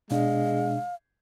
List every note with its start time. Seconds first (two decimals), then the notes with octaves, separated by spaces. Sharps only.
0.11 B2 G#3 D4 F5